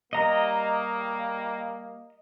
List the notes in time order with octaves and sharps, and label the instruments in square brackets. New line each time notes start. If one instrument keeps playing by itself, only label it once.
[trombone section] G3 A#3 [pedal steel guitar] D#5 A#5